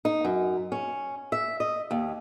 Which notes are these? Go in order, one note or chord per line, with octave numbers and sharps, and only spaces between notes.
D#4
F#2
C#4
E5
D#5
D#2